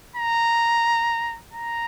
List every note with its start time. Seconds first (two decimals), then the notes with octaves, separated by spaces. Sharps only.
0.16 A#5
1.53 A#5